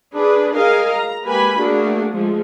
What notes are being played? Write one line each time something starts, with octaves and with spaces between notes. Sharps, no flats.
D4 G#4 B4
G#4 A#4 D#5 F5 G#5
A#5
G#3 A#3 G4 B4 G#5 B5
A3 A#3 D4 F#4 G#4
F3 G#3 A3